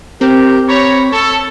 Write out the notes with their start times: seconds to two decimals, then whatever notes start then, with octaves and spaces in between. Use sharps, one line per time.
0.21 C4 G4 A#4
0.68 C#5 A#5 B5
1.12 A4 A5 C#6